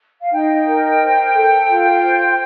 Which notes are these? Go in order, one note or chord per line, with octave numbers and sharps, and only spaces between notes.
F5
D#4 G5
A#4
C5
A4
F4
C5